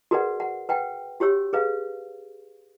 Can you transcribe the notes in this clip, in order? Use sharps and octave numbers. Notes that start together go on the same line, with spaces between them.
F#4 G#4 A#4 B4 D5 F#5
F#5
B4 F#5 G5
F#4 G4 C#5 E6
G#4 B4 F5